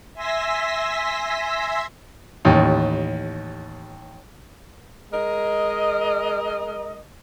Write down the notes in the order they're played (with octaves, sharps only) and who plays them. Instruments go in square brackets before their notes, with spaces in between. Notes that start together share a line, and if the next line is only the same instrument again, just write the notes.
[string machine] E5 G#5 C6 E6 A#6 B6
[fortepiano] A1 D#2
[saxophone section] G#3 A#4 D#5